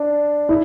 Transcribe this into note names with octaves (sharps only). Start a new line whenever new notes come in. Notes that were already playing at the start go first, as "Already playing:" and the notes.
Already playing: D4
E4